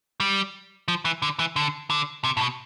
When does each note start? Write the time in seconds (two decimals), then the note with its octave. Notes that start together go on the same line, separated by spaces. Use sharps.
0.20 G3
0.88 F3
1.05 E3
1.22 D3
1.39 E3
1.56 D3
1.90 D3
2.24 C3
2.37 A2
2.41 B2